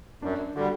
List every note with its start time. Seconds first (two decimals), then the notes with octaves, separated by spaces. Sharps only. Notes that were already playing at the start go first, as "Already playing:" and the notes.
0.22 F#2 D4
0.55 D3 G3 F#4